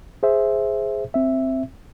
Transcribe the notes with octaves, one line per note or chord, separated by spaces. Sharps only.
G#4 C5 E5
C4 E5